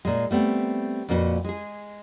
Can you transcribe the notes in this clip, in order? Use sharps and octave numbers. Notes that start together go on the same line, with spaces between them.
A#2 G#3
G3 A3 B3 C4
F2 A#2 A#3 F#4 G#4 B4
G#3 G#4